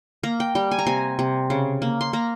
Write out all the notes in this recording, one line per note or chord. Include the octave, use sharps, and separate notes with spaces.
A#3 A#5
G5
G3 G5
G#5
A#5
C3 G#5
C3
C#3
A#3
C6
A#3 A#5